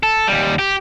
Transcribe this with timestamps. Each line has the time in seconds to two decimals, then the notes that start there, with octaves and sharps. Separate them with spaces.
0.03 A4
0.27 D#2 G3
0.59 G4